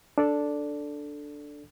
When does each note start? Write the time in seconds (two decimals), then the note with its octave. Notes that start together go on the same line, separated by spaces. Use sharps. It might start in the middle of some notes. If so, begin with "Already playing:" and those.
0.18 D4 A4 D5